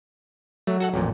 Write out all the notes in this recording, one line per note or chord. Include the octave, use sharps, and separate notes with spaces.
F#3 A3
F#4 A4 F#5
A1 F2 A#2